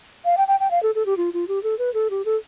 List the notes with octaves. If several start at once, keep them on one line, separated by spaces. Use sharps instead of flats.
F5
G5
G5
G5
F5
A4
A4
G4
F4
F4
G4
A4
B4
A4
G4
A4